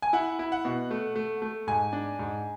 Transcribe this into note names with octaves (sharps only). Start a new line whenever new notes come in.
G#5
E4 F#5
E4
F#5
B2
A3
A3
A3
G#2 G#5
D4
G#2